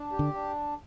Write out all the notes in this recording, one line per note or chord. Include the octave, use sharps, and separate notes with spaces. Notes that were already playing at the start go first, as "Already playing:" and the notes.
Already playing: D4
G4
D3
D4